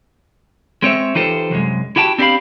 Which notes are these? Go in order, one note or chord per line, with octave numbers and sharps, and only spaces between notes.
G#3 C4 C#5 E5
E3 D#4 F4 G4 A4 C5
C2 F#2 G#3
E4 F#4 G4 G5 A5
C4 D4 G4 A4 F5 B5